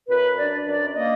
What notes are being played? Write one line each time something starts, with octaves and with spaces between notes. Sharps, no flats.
F#2 B4
D4 D5
F#2 D5
A#3 D#5